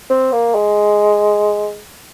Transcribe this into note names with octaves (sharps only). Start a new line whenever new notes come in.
C4
A#3
G#3